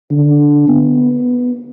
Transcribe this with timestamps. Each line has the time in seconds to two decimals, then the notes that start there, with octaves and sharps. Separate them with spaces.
0.11 D3
0.68 B3